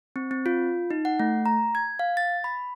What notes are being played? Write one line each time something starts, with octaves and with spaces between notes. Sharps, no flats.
C4
C4
F4
D#4
F#5
A3
A#5
G#6
F5
A6
B5